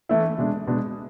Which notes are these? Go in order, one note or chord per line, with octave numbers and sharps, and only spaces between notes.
E3 A3 E4
B2 G#3 D4
B2 G#3 D4